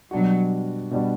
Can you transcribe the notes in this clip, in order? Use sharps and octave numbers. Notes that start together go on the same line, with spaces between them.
B2 F#3 G3 D4 F#4
B2 G3 D4 F#4